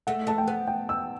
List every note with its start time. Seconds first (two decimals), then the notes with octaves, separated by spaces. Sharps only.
0.07 A3 F#5
0.27 A3 A5
0.38 G5
0.48 B3
0.68 G5
0.89 E6